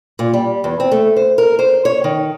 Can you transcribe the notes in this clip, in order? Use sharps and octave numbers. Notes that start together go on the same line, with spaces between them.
A#2
G3
E2
C4
A3
C5
A#4
C5
C#5
D#3